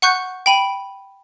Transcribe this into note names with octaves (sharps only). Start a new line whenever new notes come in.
F#5 C#6 F#6 G6
G5 B5 D#7